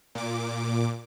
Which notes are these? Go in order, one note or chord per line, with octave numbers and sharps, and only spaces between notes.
A#2 D6